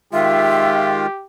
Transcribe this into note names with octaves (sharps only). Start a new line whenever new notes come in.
D#3 G#3 F4 G4 E5